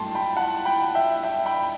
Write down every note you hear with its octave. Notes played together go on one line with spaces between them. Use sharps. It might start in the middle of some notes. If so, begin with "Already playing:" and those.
Already playing: G2 F#3 A3 G5 A5 C6
G5 B5
F#5 A5
G5 B5
E5 G5
E5 G5
G5 B5